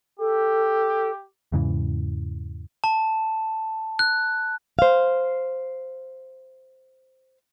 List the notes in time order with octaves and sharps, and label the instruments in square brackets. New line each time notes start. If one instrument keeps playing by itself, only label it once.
[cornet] G4 [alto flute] A4
[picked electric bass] E2 G#2 C#3 E3
[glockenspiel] A5
F#6
[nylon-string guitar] C5 F5